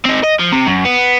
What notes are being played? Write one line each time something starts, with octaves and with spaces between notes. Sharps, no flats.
C4 D#4
D#5
F3
C3
F#2
B3